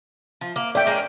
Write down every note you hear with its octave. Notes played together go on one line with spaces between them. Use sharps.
F3
A#3
A3 G4 D5 G5
G#3 A#3 C#4